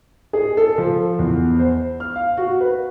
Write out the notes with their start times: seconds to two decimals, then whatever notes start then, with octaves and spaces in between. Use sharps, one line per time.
0.33 G#4
0.57 A4
0.78 F3
1.19 E2
1.59 C5
2.00 F6
2.16 F5
2.37 F#4
2.61 B4